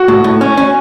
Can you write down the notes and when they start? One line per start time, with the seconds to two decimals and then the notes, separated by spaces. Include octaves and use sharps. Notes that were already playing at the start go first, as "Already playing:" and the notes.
Already playing: F#4
0.08 A2
0.24 A2
0.41 C#4
0.57 C#4